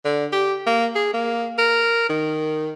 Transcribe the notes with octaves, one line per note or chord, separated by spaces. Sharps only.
D3
G4
A#3
G#4
A#3
A#4
D#3